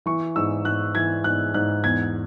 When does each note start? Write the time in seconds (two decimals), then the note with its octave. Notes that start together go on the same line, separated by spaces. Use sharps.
0.06 E3 C#6
0.36 G#2 E6
0.65 G#2 F#6
0.95 E3 G#6
1.24 G#2 F#6
1.54 G#2 F#6
1.84 E2 G#6